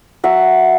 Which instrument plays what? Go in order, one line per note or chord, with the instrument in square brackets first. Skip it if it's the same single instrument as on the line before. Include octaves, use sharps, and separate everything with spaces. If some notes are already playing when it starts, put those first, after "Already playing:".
[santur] F#3 E5 F#5